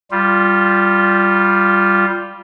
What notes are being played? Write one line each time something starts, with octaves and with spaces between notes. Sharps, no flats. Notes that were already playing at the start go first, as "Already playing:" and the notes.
G3 F4